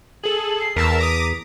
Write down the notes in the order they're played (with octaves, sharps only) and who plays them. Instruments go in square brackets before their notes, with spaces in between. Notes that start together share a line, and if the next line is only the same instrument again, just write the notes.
[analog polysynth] G#4 A4 [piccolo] F#7
[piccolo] C7
[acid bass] E2 [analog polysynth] A#4 A5 E6 [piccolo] B6
[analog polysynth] A#5 D6 D#6